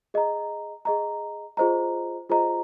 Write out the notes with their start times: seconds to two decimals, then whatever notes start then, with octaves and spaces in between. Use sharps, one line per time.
0.14 G#4 D#5 A#5
0.85 G#4 D#5 A#5
1.57 F4 G#4 C5 D#5 A#5
2.30 F4 G#4 C5 D#5 A#5